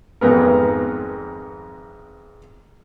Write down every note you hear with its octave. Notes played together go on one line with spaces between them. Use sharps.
G#1 F2 G#2 B3 A#4